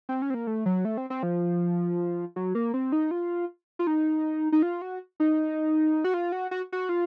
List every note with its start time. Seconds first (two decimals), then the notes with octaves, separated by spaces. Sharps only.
0.09 C4
0.22 C#4
0.30 C4
0.34 A#3
0.47 A3
0.66 F#3
0.85 A3
0.97 C4
1.10 C4
1.23 F3
2.36 F#3
2.55 A#3
2.74 C4
2.92 D#4
3.11 F4
3.79 F4
3.87 D#4
4.52 D#4
4.62 F4
4.82 F#4
5.20 D#4
6.04 F#4
6.14 F4
6.32 F#4
6.51 F#4
6.72 F#4
6.89 F4